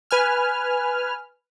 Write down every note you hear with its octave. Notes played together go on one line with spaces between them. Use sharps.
B4 G#5 F6